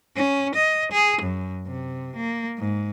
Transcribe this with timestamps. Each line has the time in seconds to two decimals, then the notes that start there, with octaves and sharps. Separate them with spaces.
0.16 C#4
0.55 D#5
0.92 G#4
1.22 F#2
1.67 C3
2.16 A#3
2.58 G#2